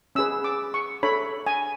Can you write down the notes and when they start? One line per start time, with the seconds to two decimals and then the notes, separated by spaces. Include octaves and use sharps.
0.15 C#4 G#4 B4 E6
0.44 D6
0.74 C#6
1.03 D4 A4 C#5 B5
1.47 G#5